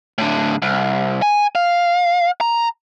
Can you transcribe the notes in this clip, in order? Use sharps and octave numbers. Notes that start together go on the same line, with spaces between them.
A2 D3
C2
G#5
F5
A#5